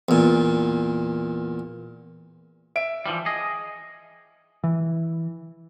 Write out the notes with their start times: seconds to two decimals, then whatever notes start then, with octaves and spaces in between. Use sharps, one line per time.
0.09 E2 A#2
2.76 E5 D7
3.06 E3 F3 G3
3.26 G#4 D#5
4.64 E3